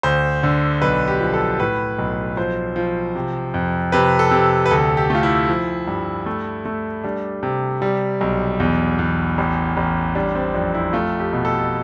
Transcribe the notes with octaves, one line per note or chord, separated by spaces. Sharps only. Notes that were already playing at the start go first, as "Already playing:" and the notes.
D2 C5
D3
B1 B4
G4
F3
A4
A2 B4
B1
F3 C5
F3
C3
F2
C3 B4
A4
C3
B4
D2 A4
G4
A3 F4
E4
F3
G2
A3
A3
G3 D4
C3
G3
B1
E2
E2
A1
A1
G3 D4
C4
F2 D4
E4
A3 F4
G4
B2
A4